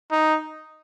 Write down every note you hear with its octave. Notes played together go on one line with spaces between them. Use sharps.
D#4